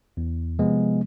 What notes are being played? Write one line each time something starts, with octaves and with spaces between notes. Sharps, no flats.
E2
C3 F3 G#3 B3